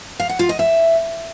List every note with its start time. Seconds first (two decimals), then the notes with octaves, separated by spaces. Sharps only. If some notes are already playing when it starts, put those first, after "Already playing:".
0.20 F5
0.29 F#5
0.39 F4
0.49 D#5
0.59 E5